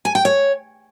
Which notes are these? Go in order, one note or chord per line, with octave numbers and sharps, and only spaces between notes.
G#5
G5
C#5